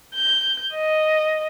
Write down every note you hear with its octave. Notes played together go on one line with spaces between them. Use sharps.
G6
D#5